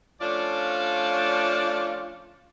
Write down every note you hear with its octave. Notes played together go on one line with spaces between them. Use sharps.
F3 A3 C#4 D4 F4 D5